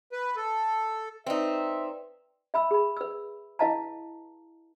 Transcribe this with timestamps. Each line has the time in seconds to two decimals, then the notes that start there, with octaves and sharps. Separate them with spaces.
0.12 B4
0.36 A4
1.26 C4 D#4 B4 D5 E5 G5
2.54 E5 B5 E6
2.71 G#4 B5
2.97 B4 E6
3.59 E4 B4 D#5 F5 A5 A#5